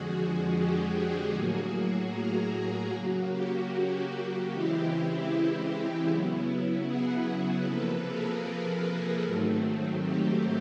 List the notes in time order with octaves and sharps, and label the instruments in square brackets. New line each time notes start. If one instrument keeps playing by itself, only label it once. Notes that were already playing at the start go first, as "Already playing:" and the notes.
Already playing: [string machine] F2 D3 F3 G#3 F#4 G#4
F#4 G#4
G4
F#4 G#4
A2 F#3 A#3 F#4 G#4
F#4 G#4
G#4 A#4
C#3 F#3 A#3 F#4
G4
G4
G4
C#3 E3 G#3 C4 E4 G4
G4
G4
C#3 F#3 B3 E4
F#4 G#4
F#4 G#4
C3 F3 A#3 A4 B4
G#4 A#4
G#4 A#4
G#2 D#3 F#3 A3 C4
G4